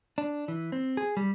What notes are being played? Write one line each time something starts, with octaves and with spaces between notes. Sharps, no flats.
D4
E3
C4
G#4
G3